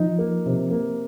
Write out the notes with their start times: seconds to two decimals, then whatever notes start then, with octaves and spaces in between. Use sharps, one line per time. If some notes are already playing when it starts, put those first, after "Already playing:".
Already playing: F3 D#4
0.19 A#3
0.46 C3
0.71 A#3